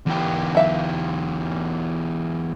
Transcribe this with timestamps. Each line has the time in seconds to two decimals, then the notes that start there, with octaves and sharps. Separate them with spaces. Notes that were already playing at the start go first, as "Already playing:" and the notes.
0.07 E2 G4
0.55 F#3 E5 F5